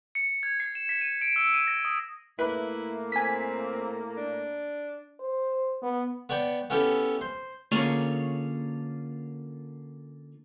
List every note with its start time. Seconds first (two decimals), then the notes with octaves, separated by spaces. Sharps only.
0.15 C#7
0.43 G#6
0.60 C7
0.75 E7
0.89 B6
1.01 D#7
1.21 D7
1.36 E6
1.54 D#7
1.67 A#6
1.85 D#6
2.39 A2 A#3 E4 B4
3.12 C4 G#5 B6
4.17 D4
5.20 C5
5.82 B3
6.29 B3 C#5 D5 G5
6.70 B3 C#4 E4 G4 A4
7.21 C5
7.72 D3 A#3 C#4 F4 G#4 C#5